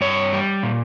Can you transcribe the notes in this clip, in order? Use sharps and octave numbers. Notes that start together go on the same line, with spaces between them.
G2 C#5
G3
A#2